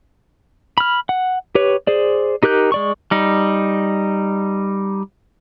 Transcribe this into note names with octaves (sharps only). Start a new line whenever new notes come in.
B5 F6
F#5
G4 B4 C#5
G#4 C5 D5
D#4 G4 A#4 F#6 G6
G#3 D5 C#6
G3 D#4